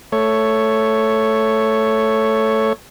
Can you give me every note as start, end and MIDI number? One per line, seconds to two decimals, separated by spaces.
0.12 2.73 57
0.12 2.73 73